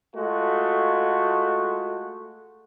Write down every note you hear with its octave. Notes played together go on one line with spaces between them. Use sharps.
G#3 A3 F4 F#4